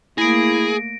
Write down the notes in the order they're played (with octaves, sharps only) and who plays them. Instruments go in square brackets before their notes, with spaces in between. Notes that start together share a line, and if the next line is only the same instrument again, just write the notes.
[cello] A3 A#3 [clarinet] E4 [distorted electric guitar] G#4 [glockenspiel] A#6 D7